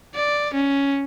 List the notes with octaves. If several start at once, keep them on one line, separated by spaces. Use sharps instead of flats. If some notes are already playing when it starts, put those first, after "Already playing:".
D5
C#4